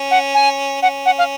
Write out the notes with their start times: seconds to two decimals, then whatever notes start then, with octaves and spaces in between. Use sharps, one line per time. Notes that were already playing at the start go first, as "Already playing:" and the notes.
Already playing: C#4
0.11 F#5
0.34 G#5
0.82 C#4 F#5
1.06 F#5
1.18 F5